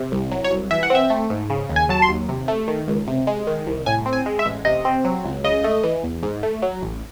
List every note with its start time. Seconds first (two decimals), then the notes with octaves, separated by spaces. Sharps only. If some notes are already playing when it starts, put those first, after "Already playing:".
Already playing: C3
0.12 C2
0.32 F#3
0.44 C#5
0.51 C2
0.71 E3 E5
0.83 F#5
0.90 C4 E5
1.10 A3
1.30 G#2
1.50 C#3
1.70 D#2
1.76 G#5
1.89 F#3 A5
2.02 C6
2.09 D#2
2.29 C3
2.48 A3
2.68 D#3
2.88 C#2
3.08 C3
3.27 G#3
3.47 D#3
3.67 C2
3.86 A2 G#5
4.06 C4
4.13 G#5
4.26 G#3
4.39 E5
4.45 A1
4.65 C3 D#5
4.85 C4
5.05 F#3
5.25 C#2
5.44 C#3 D#5
5.64 A3
5.83 E3
6.04 E2
6.23 G#2
6.43 A3
6.62 F#3
6.82 A1